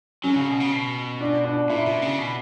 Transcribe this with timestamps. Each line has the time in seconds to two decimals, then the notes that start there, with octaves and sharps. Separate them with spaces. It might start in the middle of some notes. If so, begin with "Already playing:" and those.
0.24 F#3 C#4
0.36 C#3
0.48 B2
0.60 C#3
0.72 B2
1.20 D4
1.45 D4
1.69 A#2 E4
1.86 B2
2.02 C#3
2.18 B2